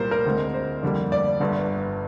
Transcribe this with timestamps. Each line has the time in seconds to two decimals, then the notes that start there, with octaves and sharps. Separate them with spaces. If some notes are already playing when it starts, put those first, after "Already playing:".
Already playing: C2 A#2 G3 A#4 C5
0.11 A#4
0.26 D2 D3 G#3 C4
0.54 C5
0.83 F2 D3 G3 A#3
1.12 D5
1.40 G1 G2 D3